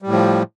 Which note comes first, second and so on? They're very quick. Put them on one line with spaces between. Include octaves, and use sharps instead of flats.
G3 A2 F3